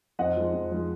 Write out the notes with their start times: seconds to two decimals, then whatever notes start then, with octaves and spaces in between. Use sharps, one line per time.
0.19 F2 D#5 F#5
0.37 F3 G#3
0.53 F2
0.71 F3 G#3